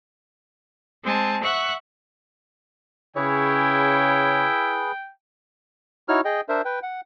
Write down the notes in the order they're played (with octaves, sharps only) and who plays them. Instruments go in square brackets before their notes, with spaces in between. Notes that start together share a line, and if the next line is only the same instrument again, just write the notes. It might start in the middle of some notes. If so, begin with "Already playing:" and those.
[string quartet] G#3 C4 G#5 A5
E5 F#5 C#6 F#6
[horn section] C#3 C#5 [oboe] E4 [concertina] G#4 B4 [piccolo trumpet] G5
[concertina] D#4 E4 F#4 C#5 F6
G#4 D#5 G5
D4 A#4 C5 E5
B4 G5
F#5